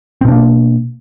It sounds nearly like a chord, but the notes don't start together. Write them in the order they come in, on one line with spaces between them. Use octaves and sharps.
C4 B2 D4 A#3